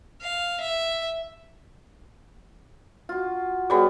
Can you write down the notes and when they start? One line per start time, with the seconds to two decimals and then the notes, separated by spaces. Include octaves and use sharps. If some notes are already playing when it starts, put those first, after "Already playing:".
0.22 F5
0.60 E5
3.09 F4 F#4
3.70 F#3 G3 B3 F#4 G#4